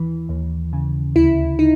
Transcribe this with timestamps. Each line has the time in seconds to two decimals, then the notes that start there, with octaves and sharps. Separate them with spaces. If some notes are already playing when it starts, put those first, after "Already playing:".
Already playing: D#2 E3
0.29 D#2
0.73 C#3
1.15 D2 E4
1.59 D#4